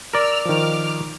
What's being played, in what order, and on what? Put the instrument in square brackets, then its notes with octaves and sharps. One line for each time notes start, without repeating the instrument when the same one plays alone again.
[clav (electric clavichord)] A#4 D5 [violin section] E6 F6
[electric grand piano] D#3 F3 [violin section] D6 F6